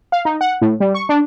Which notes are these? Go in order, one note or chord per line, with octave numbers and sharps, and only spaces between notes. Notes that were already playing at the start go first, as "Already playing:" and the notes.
F5
D#4
F#5
A2
G3
C#6
D4